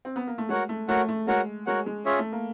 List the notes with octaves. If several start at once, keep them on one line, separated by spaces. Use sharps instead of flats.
C4
B3
A#3
A3
G#3 F#4 A#4 C#5 F#5
A3
A3 F#4 A#4 C#5 F#5
A3
G#3 F#4 A#4 C#5 F#5
G#3 F#4 A#4 C#5 F#5
G#3
C#4 F4 G#4 C#5 E5
A3
A#3